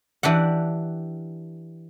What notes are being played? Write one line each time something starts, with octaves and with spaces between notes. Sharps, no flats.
E3 D4 G4 F#5